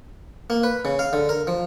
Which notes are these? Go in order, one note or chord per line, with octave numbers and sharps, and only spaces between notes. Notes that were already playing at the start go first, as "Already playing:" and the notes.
A#3
B4
C#3
F5
D3
A#4
F3